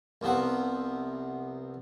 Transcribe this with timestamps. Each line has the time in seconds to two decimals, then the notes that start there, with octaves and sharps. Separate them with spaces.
0.21 C2 C3 F3 B3 F#5